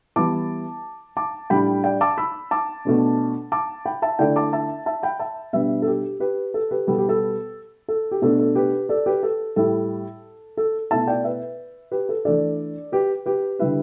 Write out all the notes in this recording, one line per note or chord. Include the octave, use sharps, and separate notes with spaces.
E3 G3 B3 E4 A5 D6
A5 D6
A2 G3 D4 G5 B5
D5 G5
A5 D6
B5 E6
A5 D6
B2 A3 D4
A5 D6
G5 B5
E5 A5
D3 A3 E4 D5 G5
A5 D6
E5 A5
E5 A5
G5 B5
E5 A5
B2 G3 D4 B4 E5
A4
G4
G4 B4
A4
G4 B4
B2 G3 B3 A4
G4
A4
A4
G4
B2 A3 D4 A4
A4
G4 B4
A4 D5
G4 B4
A4
A2 G3 E4 A4
A4
B2 A3 E4 E5 A5
D5 G5
B4 E5
G4 B4
A4
E3 A3 D4 A4 D5
G4 B4
G4 B4
D3 G3 E4 B4 E5